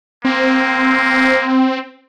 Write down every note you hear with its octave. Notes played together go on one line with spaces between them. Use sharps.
A#3 C4